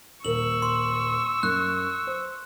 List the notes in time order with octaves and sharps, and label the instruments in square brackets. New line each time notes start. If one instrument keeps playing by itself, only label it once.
[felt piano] D#1 A#4 [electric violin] C#6 E6 [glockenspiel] F#7
[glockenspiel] C6
[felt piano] F#2 [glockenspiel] F#6
[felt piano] C5